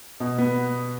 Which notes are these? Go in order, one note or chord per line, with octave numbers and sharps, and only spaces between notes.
B2
B3